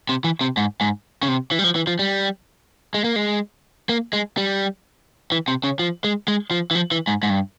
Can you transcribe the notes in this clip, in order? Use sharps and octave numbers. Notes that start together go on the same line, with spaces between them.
C3
E3
C3
G#2
G#2
C#3
C3
E3
G3
F3
E3
F3
G3
G#3
A#3
G#3
A#3
G#3
G3
E3
C3
C#3
F3
G#3
G#3
F3
E3
F3
E3
G#2
G#2
G2